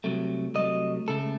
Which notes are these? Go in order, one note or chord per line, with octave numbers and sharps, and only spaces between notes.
C2 C3 F#3 A3
C2 C3 F#3 A3 D#5
C#2 C#3 A3 A4